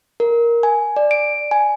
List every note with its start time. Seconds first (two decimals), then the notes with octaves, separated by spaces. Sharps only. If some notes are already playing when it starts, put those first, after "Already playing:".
0.20 A#4
0.63 G#5
0.96 D5
1.11 D7
1.51 G#5